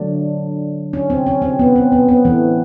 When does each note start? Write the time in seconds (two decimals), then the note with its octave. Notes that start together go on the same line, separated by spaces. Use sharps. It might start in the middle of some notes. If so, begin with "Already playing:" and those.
Already playing: D3 F#3 A3 D4
0.93 C#4
1.10 C4
1.27 C#4
1.42 C4
1.59 B3
1.75 C4
1.92 B3
2.09 B3
2.25 E3 A3